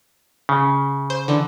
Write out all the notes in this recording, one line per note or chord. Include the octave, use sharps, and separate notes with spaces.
C#3
C5
D3 E3 D4